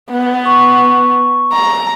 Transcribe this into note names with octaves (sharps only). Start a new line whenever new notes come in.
B3
C#6
A#5